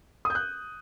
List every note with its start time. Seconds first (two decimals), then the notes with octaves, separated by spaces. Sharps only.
0.25 D#6
0.30 G6
0.35 F#6